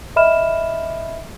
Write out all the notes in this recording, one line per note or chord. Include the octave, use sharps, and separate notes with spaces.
D#5 E5 B5 F6 E7